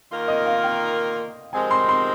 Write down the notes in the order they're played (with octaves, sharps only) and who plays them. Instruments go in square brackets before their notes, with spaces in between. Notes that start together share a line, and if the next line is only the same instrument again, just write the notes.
[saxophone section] D#3 A#3 F4 A#4
[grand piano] D#5
F5
G5
[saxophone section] F3 G#3 C4 G4 A#4 [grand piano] G#5
[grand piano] C6
C6